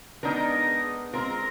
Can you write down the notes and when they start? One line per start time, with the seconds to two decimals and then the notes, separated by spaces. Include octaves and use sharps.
0.23 G#3 B3 D4 D#4 A#4
1.13 G#3 C4 F4 A#4